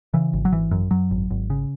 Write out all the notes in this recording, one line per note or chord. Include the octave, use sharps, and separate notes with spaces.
C#3 E3
G#1
F#3
G#1 E3
F#2
F#2 F#3
G#1
G#1
C#3